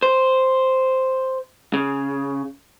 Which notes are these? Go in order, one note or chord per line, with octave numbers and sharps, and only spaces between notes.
C5
C#3